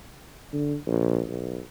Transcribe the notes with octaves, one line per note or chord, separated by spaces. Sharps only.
D3
A#1
B1